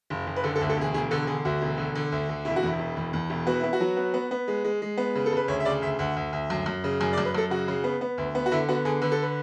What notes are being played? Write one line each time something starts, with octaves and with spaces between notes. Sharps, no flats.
F#1
F#1
B4
D3 A4
A4
D2
A4
E1 G#4
E1 G#4
D3 A4
D3 G#4
D2 F#4
E1
D3
D3
D2
D3
E1 E4
F#4
E2 E4
E1
E2
E2
E1
B3 F#4
B3 E4
F#4
F#3
B3
B3
B3
G#3
G#3
G#3
B3
C#3
A4
C#3 B4
D2 C#5
E5
C#3 D5
D2 E5
D2 F#5
D2
D2
F#2
F#2
C#3
F#2 G#5
D5
F#2
B4
F#2 A4
C#3 F#4
C#3
B3
B3
D2
B3
F#4
D3 E4
B3 F#4
D3 G#4
D3 B4
A4
B4